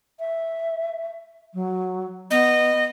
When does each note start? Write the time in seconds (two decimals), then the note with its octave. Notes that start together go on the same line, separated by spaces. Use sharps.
0.19 E5
1.54 F#3
2.31 B3 D#5